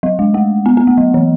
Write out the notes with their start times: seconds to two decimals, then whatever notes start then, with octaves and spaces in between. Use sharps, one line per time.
0.03 F#3
0.19 G#3
0.34 A3
0.66 B3
0.77 B3
0.87 A3
0.98 F#3
1.14 E3